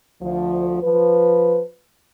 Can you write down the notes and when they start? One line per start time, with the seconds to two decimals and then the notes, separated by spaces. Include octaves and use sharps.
0.22 D2 F3
0.83 F3 B4